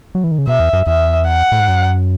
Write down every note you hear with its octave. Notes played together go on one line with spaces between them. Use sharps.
F#3
E3
D#3
C#3
B2 E5
E2
F#2
E2 E5
F#5
A2
G#2
F#2